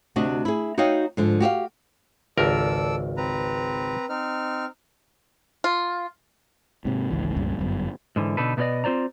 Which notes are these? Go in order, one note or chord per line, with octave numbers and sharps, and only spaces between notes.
D2 C3 D4 F#4 D#5
E4 G#4
D#4 F#4 C#5 D#5 F5 G5
G#2 D3 F3
F#4 G4 E5 F5
G#1 C#2 A4 A#4 D5 E6
C4 B4 A#5
C4 D#4 F6
F4
G#2 C3
G#1 C#2 E3
C#2 G2 A#2 C#3
G1 F#2 B3
G#2 D3 E3
B2 D3 D#4 A4 B4
B2 A3 B3 F4 D5 D#5
C4 F4 C5 D5 A#5